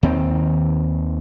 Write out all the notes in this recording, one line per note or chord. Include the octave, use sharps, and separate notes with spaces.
D#2 D#3 C4